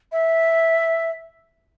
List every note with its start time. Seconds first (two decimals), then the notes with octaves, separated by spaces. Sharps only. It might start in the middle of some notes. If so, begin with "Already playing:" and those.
0.12 E5